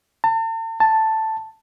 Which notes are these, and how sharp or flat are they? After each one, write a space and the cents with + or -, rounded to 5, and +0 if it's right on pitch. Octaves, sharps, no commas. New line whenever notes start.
A5 +40
A5 +5